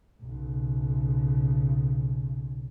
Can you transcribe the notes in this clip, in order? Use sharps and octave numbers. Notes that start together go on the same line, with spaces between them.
B1 C#3